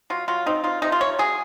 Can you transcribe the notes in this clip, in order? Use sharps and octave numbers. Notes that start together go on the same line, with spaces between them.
F#3 F4
F#3 F4
C4 D#4
D#4 F4
C3 D#4
F4
C3 C#5
F#3 G#4